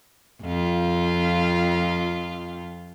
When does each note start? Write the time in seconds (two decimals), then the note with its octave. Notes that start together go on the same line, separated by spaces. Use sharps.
0.42 F2 F4